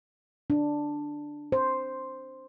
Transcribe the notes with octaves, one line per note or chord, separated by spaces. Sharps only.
D4
C5